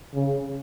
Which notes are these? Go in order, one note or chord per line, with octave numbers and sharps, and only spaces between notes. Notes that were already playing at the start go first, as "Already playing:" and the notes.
C#3